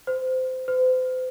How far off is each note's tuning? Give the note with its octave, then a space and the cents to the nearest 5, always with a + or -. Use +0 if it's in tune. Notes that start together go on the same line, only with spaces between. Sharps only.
C5 -25
C5 -40